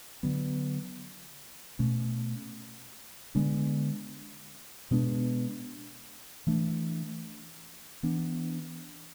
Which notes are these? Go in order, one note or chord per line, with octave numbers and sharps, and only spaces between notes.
D3 F#3 B3
B2 A3 C#4
D3 G#3 B3 D4
B2 G#3 B3 D4
E3 A3 D4
E3 B3 D4